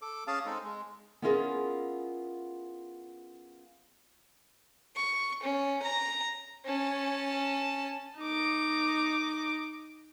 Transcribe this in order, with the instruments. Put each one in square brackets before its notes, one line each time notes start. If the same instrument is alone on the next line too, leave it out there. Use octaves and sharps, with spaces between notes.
[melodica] A4 D6
C#4 G#4 F5 A5
G#3 C4 D#4 A4
G#3
[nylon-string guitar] B3 C#4 E4 F4 G#4 A#4
[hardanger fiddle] C#6
C#4
A#5
[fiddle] C#4 A5
[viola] D#4 D6